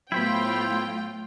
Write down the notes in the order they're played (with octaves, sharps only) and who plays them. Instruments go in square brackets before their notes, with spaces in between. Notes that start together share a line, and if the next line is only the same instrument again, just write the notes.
[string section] A2 F4 G5 [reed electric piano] F#3 B3 [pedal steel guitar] E4 C5 B5